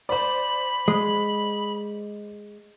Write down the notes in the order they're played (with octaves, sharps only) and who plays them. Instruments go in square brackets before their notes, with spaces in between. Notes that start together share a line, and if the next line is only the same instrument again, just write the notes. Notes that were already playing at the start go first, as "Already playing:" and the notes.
[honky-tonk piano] C5 D5 [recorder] B5
[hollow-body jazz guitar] G#3